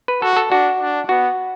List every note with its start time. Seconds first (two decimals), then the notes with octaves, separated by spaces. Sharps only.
0.08 B4
0.22 F#4 A4
0.37 A4
0.51 D4 F#4
0.81 D4
1.09 B3 F#4